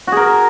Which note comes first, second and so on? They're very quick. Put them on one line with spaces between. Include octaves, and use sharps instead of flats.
F#4 G#4 A#4